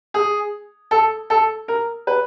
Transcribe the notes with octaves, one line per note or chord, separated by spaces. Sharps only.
G#4
A4
A4
A#4
B4